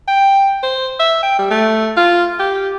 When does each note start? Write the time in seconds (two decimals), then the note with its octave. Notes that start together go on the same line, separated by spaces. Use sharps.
0.08 G5
0.63 C5
0.99 E5
1.23 G5
1.39 G3
1.51 A3
1.97 F4
2.39 G4